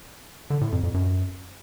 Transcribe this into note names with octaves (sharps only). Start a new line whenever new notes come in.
D3
A2
F2
F2
F#2